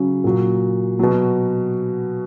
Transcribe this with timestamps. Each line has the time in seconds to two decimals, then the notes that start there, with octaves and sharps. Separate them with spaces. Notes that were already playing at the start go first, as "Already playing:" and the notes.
Already playing: C#3 F#3
0.24 A#2 F#3
0.99 B2 F#3